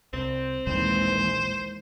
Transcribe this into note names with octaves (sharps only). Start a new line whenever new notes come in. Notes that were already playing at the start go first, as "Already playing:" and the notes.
C2 C4
A#1 D#2 A2 E3 G3 G#3 C5